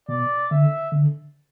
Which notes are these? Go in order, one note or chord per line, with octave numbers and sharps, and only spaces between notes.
B2 D5
D3 E5
D3